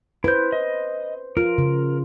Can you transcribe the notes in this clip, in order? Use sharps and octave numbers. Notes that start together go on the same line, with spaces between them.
E4 B4 C5 G6
D#5
F4 A#4
C#3